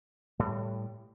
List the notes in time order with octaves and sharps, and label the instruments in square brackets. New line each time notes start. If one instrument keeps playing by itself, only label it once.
[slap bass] A2 G3